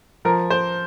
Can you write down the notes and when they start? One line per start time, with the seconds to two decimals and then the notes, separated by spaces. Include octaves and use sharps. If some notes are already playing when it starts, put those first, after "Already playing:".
0.25 F3 A#4
0.50 C5